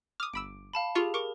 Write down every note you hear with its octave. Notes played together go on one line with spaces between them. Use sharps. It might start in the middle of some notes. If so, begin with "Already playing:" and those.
D6 D#6 F6
G1 B5 E6 D7
F5 A5 B5
F4 G4 G#4 C#6
A#4 C#6 D6